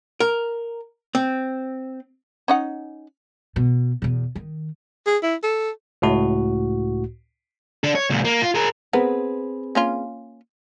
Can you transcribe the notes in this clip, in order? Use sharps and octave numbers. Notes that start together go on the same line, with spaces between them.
A#4
C4
C#4 D#4 F#5
B2
E2 B2
D#3
G#4
E4
A4
C#2 A2 F#4
D4 A4
C#5
C#2 A#2
A#3
F4
G#4 A#4
B3 C4 G#4 A#4 B4
A#3 C#4 F4